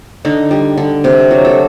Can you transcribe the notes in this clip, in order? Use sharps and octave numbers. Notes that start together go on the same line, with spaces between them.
D3 D#4
G3
D3
C3 G4
F#3
A4